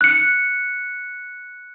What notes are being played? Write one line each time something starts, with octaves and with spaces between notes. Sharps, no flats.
F#6 C#7